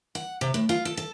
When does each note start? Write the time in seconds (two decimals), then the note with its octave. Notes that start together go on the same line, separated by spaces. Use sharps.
0.15 F#5
0.41 C3
0.54 A2
0.69 F4
0.85 A4
0.97 A4